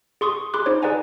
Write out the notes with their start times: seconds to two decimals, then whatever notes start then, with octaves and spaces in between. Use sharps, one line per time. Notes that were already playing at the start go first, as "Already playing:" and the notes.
0.21 G#4 C6 C#6 D#6
0.54 G#4 B5 C6 D6 F#6
0.66 D#4 G#4 C5 C#5
0.82 G#4 B4 D5 F#5 G#5 A#5